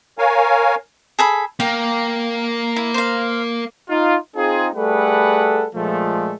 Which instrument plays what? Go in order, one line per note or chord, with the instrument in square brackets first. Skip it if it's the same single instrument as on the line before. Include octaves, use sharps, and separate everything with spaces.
[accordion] A#4 C#5 F5 G#5
[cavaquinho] G#4 A4 B5
[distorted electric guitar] A#3 [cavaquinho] F5 G5
[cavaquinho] E4
C5 F5
[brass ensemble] D#4 F4
C4 D#4 F4 G#4
G3 A3 G#4 A4 B4 F#5
A#2 F3 G#3 A3